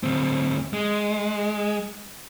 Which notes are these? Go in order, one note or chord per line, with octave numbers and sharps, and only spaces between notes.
D2 C4
G#3